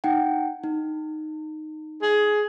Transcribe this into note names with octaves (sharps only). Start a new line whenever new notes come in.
D#4 F#5 G5
D#4
G#4